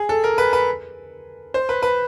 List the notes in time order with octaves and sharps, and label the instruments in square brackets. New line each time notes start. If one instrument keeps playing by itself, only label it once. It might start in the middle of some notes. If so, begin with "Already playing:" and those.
Already playing: [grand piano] G#4
A4
A#4
B4
B4
C5
B4
B4